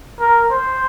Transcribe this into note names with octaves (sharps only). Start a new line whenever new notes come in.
A#4
C5